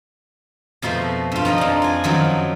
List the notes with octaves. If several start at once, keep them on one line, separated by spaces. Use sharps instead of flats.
F2 B2 F3 A3 C5
G2 F4
F3 D#4 D#5
F2 D4
F4 G#5
F#2 D#3 F3 F#3